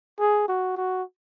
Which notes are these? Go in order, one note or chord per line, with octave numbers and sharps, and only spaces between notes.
G#4
F#4
F#4